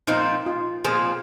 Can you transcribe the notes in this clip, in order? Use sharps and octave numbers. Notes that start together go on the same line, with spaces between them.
A#2 F3 C4 D#4
F4
A#2 F3 C4 G#4